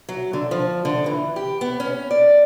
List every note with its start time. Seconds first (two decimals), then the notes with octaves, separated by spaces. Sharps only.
0.09 F#3
0.33 D3
0.51 F3
0.85 D3
1.06 E3
1.36 G4
1.61 B3
1.80 C#4
2.11 D5